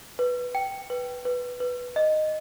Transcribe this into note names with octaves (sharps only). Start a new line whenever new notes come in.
B4
G5
B4
B4
B4
D#5